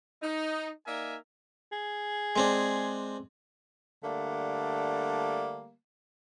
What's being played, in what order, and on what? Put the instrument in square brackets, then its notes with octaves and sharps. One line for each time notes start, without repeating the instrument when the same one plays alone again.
[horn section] D#4
A#3 D#4 A#4 D5 E5 G#5
[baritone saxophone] G#4
[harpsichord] G#3 C4 D4
[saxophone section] D3 G3 A3 A#3